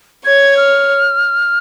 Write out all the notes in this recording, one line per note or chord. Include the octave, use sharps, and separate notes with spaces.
C#5 G#6
F6